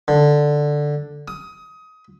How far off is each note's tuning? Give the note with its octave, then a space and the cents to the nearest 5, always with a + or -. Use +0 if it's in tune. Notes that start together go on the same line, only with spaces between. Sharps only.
D3 +5
D#6 +20